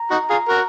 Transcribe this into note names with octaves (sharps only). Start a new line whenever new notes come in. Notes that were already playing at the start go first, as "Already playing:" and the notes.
Already playing: A#5
D#4 F#4
F4 G#4
F#4 A#4